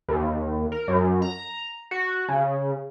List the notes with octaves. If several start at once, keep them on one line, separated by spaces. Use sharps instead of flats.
D#2
A#4
F#2
A#5
F#4
C#3